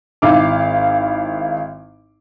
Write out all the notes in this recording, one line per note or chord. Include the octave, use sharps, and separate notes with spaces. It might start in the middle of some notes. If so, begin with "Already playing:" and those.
G#1 E4 F5 D6